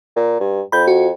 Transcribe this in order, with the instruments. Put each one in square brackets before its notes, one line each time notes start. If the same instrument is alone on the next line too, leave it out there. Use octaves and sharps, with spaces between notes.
[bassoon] A#2
G2
[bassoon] F2 [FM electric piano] B5 G6
[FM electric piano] F#4